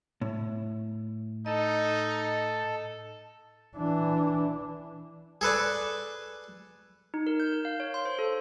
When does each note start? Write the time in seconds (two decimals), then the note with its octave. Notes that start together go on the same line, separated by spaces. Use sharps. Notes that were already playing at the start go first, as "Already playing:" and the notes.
0.22 A2
1.46 D#4 A4 D#5
3.77 E3 D4
5.41 G#4 A4 B4 D5
7.14 D#4
7.27 A#4
7.40 G6
7.52 A#4
7.65 F5
7.80 C#5
7.94 C6
8.05 C5
8.19 A4